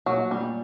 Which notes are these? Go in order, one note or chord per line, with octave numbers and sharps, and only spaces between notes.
A#2 F#3
A#2 G3